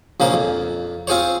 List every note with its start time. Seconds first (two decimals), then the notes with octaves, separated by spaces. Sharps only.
0.20 A#1 C#3 A#3 C5
0.33 F2
1.07 C4 F4 G#4 C5 C#5